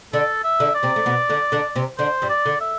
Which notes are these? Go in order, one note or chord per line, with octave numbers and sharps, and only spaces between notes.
D3 D4 A4
E5
D3 D4
D5
C3 C4
A3
B2 B3
D3 D4
D3 D4
C3 C4
D3 D4 C5
G2 G3
D5
D3
E5